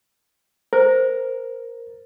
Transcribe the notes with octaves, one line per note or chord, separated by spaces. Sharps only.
A#4 C5